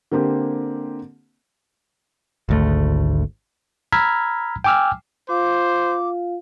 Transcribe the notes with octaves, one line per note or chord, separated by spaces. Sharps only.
D3 A#3 C4 G4
G#1 D2 A3
A#5 B5 E6 F6 G#6 B6
G5 G#5 D6 E6 F6
F4 C5 F5 D6